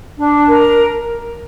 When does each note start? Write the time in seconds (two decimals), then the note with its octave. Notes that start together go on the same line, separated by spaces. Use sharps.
0.18 D4
0.48 A#4